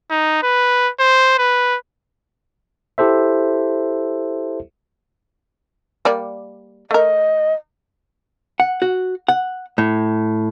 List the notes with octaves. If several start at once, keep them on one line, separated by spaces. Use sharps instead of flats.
D#4
B4
C5
B4
E4 G4 A4 C5 E5
G3 A#3 D5
A3 A#4 D#5
F#5
F#4
F#5
A2